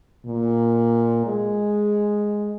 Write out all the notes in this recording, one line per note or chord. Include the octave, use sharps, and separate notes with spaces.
A#2
G#3